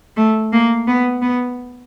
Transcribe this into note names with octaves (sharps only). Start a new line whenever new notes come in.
A3
A#3
B3
B3